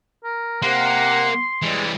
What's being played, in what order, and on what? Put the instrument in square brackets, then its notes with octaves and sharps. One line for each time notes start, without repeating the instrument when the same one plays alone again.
[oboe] A#4
[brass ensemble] C3 F#5 [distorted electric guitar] A#3 [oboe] C6
[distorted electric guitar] E3 G3 [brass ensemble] G#3